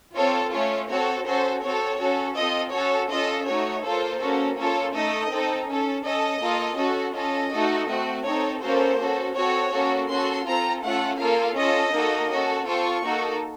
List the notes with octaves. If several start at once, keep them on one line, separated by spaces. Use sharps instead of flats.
C4 F4 A4 C#5
A3 C#4 F4 C#5
C4 F#4 A4 C#5
C#4 F#4 A4 C5
C4 F#4 A4 C#5
C#4 F#4 A4
C4 F4 A4 D#5
C#4 F#4 A4 C#5
C#4 F4 A4 D#5
A3 D#4 F#4 C#5
A#3 F4 A4 C5
A#3 C#4 F#4 A4
A#3 C#4 F4 A4 C#5
A3 D#4 A4 D#5
C4 D#4 A4
C#4 A4
C#4 A4 D#5
A#3 F4 A4
C#4 F#4 A4
C#4 F4 A4 D#5
A3 D#4 F#4 A4
A3 C4 F#4
C4 D#4 A4 C#5
A#3 C#4 F#4 A4 C5
C#4 F#4 A4
C4 F#4 A4 C#5
A#3 C#4 F#4 A4
C#4 F#4 A4 C6
C4 F4 A4 A#5
A3 C#4 F4 A4 F#5
A#3 F4 A4 F5
C#4 F4 A4 D#5
A#3 D#4 F#4 A4
C#4 F#4 A4
C4 F4 A4 C#6
A#3 D#4 F#4 A4